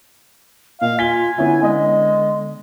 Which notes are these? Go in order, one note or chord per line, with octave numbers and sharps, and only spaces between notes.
A#2 D#5 F5
F4 G#5 B6 G7
D3 B3 C#4 E4
G#3 B3 D#5